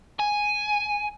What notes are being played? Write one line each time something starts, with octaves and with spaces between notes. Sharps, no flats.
G#5